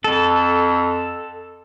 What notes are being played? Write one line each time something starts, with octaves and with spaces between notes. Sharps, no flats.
F2 A4